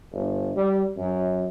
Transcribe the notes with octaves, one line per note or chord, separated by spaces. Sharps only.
G1
G3
F#2